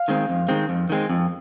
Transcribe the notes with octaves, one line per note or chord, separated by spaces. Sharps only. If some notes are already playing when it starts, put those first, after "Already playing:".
Already playing: F5
D#3 G#3 C4
F2
D#3 G#3 C4
F2
D#3 G#3 C4
F2